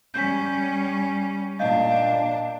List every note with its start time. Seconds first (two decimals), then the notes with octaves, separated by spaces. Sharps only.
0.14 G3 C#4 G6 B6
1.59 A#2 D4 D#5 F5 G6